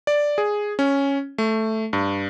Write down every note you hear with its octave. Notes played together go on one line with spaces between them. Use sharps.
D5
G#4
C#4
A3
G2